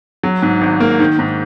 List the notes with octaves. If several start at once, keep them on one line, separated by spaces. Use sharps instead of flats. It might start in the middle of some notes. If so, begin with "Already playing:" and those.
F#3
G#2
G#1
A#3
D#3
G#2